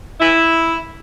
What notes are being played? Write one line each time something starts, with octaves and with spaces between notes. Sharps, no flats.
E4